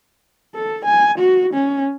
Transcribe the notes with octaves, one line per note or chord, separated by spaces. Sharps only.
A4
G#5
F#4
C#4